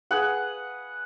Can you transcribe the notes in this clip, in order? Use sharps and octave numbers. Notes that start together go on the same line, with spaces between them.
G#4 B4 F#5